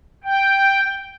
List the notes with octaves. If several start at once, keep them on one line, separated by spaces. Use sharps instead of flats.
G5